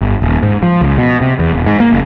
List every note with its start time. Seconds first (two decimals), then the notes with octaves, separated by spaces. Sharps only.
0.01 G1
0.22 D#1
0.43 G#2
0.63 F3
0.81 C#2
0.98 B2
1.21 C3
1.39 E2
1.53 E1
1.66 G#2
1.80 A#3
1.92 F#1